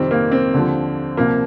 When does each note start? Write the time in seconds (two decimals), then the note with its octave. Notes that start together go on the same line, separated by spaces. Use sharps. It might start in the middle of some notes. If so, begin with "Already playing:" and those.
Already playing: F2 C3 D#3 G3 C4
0.11 A#3
0.32 C4
0.54 D#2 D3 F3
1.17 C2 C3 F3 A#3